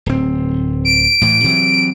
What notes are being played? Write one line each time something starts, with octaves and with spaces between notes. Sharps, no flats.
D1 C4
D7
A2 E3
C3 E3 F#3